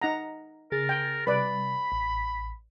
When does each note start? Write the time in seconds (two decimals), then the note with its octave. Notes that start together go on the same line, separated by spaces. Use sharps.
0.02 D#4 F#5 A#5
0.72 C#3 G#4 A#4 A6
0.89 G5
1.27 C3 G3 B4 D5 B5
1.92 A1